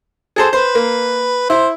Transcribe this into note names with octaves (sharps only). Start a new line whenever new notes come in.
G#4 A4 C5
B4 C5
A#3
E4 C5